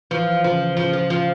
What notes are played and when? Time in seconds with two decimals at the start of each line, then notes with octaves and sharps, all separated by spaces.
0.11 E3 F3
0.44 C#3 F3
0.77 C#3 F3
0.93 F3
1.10 F3